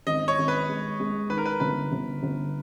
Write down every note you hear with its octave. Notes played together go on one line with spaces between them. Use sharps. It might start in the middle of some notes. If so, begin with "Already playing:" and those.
G#1 D#5
C#5
G#1
B4
G#3
G#3
D#3 B4
A#4
B4
G1 B4
G1
G1